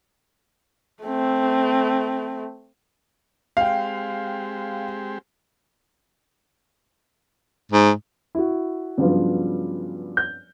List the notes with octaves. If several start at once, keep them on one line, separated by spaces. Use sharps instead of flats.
A3 C4
G#3 C4 G4 F5 G5
G#2
E4 F#4
G2 C#3 F3 F#3 B3 F4
G6